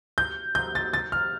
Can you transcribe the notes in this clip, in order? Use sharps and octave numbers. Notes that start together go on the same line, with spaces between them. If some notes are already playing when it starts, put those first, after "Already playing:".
G6
G6
A6
A6
F6